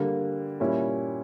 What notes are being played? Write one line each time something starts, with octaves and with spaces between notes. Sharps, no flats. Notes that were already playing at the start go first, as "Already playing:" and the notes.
Already playing: D3 G3 A#3
A#2 G3 C#4 E4